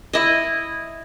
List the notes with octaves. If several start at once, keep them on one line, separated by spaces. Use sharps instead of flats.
E4 D#5